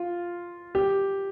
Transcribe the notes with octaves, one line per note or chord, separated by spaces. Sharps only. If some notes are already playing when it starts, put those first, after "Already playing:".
Already playing: F4
G4